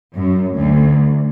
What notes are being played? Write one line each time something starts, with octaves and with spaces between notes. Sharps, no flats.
F#2
D2